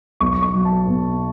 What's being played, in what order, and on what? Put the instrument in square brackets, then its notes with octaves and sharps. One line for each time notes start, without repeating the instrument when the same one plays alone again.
[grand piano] B1 C#6
C#6
F#3
A5
B2